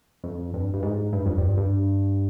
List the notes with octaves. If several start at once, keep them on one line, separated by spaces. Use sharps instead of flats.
F2
G2
G2
G#2
G2
F2
G2
G2